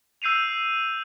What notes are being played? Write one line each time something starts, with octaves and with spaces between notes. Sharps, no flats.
E6 G6 C7 D#7 F7